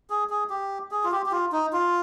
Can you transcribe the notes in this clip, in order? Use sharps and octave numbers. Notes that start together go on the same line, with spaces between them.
G#4
G#4
G4
G#4
F4
G4
G4
F4
D#4
F4